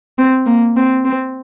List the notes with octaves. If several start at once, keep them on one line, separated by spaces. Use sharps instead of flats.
C4
A#3
C4
C4